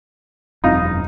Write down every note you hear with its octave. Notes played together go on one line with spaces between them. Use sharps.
E1 F#2 C4 D#4 F4